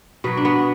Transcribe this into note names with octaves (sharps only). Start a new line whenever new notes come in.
B2 F#3 B4
D4
B3